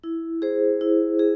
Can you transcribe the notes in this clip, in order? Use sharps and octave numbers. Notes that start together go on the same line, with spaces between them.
E4
G#4 C5
E4
G#4